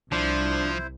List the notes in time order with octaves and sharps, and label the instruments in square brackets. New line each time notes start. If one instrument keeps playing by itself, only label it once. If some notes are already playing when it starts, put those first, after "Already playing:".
[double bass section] C2 [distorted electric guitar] F3 [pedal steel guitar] D4 [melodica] E4 C5